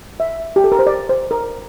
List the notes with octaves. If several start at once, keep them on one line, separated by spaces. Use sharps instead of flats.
E5
G4
A4
A#4
C5
D5
C5
A#4